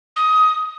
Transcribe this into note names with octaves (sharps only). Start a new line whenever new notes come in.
D#6